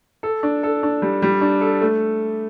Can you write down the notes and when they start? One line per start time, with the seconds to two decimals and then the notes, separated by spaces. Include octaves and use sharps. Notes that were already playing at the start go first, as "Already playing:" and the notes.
0.23 A4
0.43 D4
0.63 A4
0.83 D4
1.02 G3
1.22 G3
1.41 D4
1.61 A4
1.81 A3